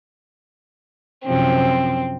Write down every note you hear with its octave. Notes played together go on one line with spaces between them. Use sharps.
F#2 C3 F3 C4